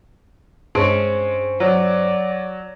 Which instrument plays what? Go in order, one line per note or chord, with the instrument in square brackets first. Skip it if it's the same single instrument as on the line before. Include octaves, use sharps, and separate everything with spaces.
[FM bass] G2 [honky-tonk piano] G#3 [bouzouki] C4 C#4
[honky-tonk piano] F#3 [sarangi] D5